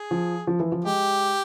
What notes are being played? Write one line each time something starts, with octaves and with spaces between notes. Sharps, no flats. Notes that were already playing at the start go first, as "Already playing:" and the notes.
Already playing: G#4
F3
F3
E3
F3
G#3 G4